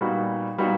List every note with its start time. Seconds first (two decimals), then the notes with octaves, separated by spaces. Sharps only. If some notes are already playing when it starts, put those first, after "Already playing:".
0.01 A#2 G3 B3 D#4 F#4
0.58 A#2 G3 B3 D#4 F#4